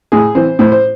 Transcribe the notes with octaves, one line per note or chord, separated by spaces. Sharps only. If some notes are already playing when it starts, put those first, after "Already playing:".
A2 G#4
E3 C4 C5
A2 C5
C5